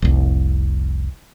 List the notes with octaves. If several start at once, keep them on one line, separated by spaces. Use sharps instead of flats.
F1 C2